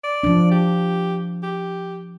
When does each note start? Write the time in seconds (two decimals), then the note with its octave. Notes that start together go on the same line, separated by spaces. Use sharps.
0.04 D5
0.23 F3 D4
0.52 G4
1.43 G4